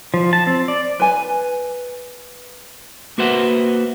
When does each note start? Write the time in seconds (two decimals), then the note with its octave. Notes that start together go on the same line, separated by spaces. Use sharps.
0.14 F3
0.33 A5
0.47 C4
0.68 D5
1.00 B4 G#5
3.18 A#3 F#4 B4 C5 E5 F#5